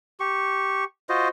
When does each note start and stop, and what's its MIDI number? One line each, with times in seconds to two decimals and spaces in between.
0.20 0.84 67
0.20 0.84 85
1.09 1.28 65
1.09 1.28 66
1.09 1.28 72
1.09 1.28 75